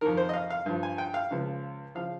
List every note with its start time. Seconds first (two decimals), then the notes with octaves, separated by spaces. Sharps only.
0.01 F2 D#3 A#4
0.17 C5
0.29 D#5
0.34 F5
0.50 F5
0.66 G2 F3
0.83 G#5
0.98 G5
1.14 F5
1.31 C#2 C#3 F3
1.95 C#3 F3 F5